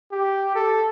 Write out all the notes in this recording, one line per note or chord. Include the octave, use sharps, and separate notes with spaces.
G4
A4